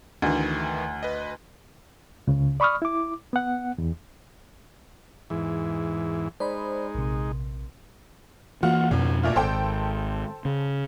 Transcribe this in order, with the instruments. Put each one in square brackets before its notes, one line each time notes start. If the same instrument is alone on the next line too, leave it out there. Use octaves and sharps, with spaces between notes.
[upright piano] D2 [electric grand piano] D#3 E3
[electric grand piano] B4 D#5
[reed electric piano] C#2 C#3
D5 B5 C#6 D#6 F6
E4 D6
B3 F#5
E2
[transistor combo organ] E2 G#2 E3
[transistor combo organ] G#3 D#4 [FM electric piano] C5 D5 B5
[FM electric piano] A#1 C3
[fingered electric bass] E3 A#3 [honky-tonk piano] F4 F#4 F#5
[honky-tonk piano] G#1 [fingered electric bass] F2 B2
[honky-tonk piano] A#2 A3 F4
[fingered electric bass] G#1 [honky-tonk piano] A4 C5 G5
[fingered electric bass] C#3